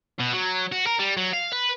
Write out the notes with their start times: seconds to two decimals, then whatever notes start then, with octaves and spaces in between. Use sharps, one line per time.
0.20 B2
0.33 F#3
0.72 F#4
0.87 A#4
0.99 G3
1.17 F#3
1.33 F5
1.53 B4